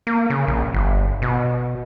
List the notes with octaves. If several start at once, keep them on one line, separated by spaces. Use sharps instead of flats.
A#3
C#3
A#1
G1
B2